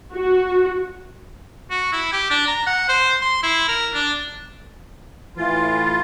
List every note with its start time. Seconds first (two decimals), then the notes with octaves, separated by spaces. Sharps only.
0.13 F#4
1.71 F#4
1.93 E4
2.13 G4
2.30 D4
2.48 A#5
2.67 F#5
2.88 C5
3.21 C6
3.43 E4
3.68 A#4
3.93 D4
5.37 A2 E3 F4